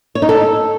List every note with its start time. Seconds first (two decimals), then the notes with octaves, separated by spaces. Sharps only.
0.15 C#5
0.22 D#4
0.29 A4